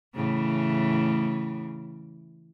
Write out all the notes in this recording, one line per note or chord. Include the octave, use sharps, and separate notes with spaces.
A2 C#3 E3